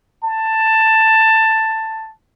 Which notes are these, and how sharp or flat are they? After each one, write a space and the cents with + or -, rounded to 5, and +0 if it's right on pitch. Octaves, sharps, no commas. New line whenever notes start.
A5 +10